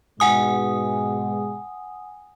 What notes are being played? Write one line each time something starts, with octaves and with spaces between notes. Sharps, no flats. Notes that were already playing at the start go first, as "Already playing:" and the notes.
G#2 B2 G#3 F#5 G#5 D#6